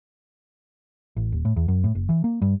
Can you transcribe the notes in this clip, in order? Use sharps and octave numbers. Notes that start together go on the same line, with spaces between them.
A1
D#1
A2
E2
F#2
A2
F#1
E3
A#3
G2